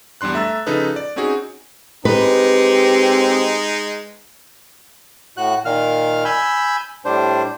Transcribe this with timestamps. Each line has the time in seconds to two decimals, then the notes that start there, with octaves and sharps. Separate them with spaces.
0.21 E2 G3 D4 C6 F#6
0.34 A3 E5 A#5 E6 A6
0.66 C#3 F3 D#4 A4 B4 D#6
0.96 D5
1.16 C4 C#4 D#4 F#4 G#4
2.05 G#3 C4 D#4 G4 B4
5.37 A2 F#4 F#6
5.65 A#2 D#3 F5 F6
6.25 G#5 B5 E6 G6
7.05 A2 G3 D4 C5